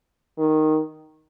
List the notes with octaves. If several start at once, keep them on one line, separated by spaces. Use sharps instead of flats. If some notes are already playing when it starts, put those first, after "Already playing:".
D#3